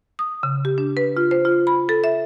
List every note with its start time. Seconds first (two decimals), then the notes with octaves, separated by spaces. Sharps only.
0.19 D#6
0.43 C#3
0.65 G4
0.78 D4
0.97 B4
1.17 F4
1.31 C5
1.45 F4
1.67 B5
1.89 A4
2.04 E5